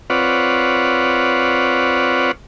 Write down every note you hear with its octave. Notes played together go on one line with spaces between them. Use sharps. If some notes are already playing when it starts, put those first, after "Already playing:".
C4 F4 B4 C#5 D5 F#5